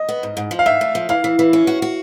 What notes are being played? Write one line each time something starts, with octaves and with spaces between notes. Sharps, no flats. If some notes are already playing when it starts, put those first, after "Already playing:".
Already playing: D#5
B3
G#2
G#2
F3
F5
G#2 E5
A3
F3
E3 F5
E3
E3
C#4
F#4
F#4